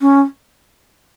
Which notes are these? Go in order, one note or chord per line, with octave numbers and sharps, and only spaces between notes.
C#4